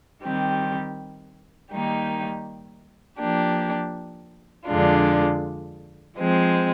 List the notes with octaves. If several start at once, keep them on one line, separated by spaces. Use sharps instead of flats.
D#3 G3 C4 G4
D#3 G3 A#3 D#4 G4
F3 A#3 D4 G4
F2 D3 G#3 D4 F4
F3 G#3 C4